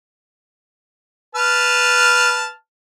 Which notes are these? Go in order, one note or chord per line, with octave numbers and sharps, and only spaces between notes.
B4 A5 F6